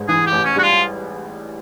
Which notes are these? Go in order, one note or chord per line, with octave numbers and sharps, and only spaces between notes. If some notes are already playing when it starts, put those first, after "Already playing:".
Already playing: A1 G#2
E3 G#4
G4
A1
C#4
G3 F#4
F4